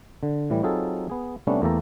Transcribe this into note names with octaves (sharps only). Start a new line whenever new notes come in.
D3
A2 E3 G3
F#3 C4 D#4 F4 G#4 A4
B3 G#4
C3 G3 A3 B3 C#4 D4
E2 A3 A#3 G4 A4 A#5